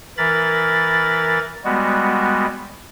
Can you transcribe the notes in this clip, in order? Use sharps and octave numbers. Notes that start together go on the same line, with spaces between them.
E3 A#4 B5 A6
G3 G#3 B3 F#4